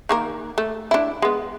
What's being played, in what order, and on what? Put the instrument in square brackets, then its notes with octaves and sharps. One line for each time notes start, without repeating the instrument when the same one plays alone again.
[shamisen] D#3 A#3 A#4
A3
D4 E4
G#3 B3